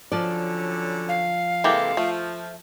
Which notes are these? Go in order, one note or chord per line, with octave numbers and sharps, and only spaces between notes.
D3 F3 F#3 C#4 D5
F5
C3 E3 G#3 A#3 G4 A4
F3 A3